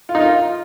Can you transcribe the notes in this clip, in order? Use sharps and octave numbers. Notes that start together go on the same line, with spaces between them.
F4
D#4
F4